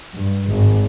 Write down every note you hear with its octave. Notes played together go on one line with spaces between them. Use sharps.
G2
G#1